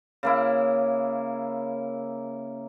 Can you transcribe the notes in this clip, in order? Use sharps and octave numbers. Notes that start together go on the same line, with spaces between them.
C#3 A#3 E4